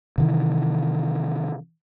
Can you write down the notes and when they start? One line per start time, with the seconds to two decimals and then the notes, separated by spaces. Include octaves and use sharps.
0.18 C3 D#3 E3